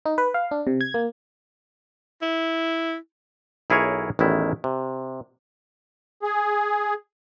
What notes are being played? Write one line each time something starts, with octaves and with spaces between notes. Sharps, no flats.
D#4
B4
F5
D4
C3
G#6
A#3
E4
B1 E4 G#4 A#4 C#5
A1 E2 D#3 E4
C3
G#4